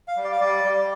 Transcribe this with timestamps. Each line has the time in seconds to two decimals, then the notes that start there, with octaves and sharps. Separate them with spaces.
0.08 F5
0.17 G3
0.24 D5
0.32 F5
0.40 G3 D5
0.64 G3